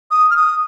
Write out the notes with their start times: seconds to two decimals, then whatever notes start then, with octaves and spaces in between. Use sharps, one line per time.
0.11 D#6
0.30 F6
0.37 D#6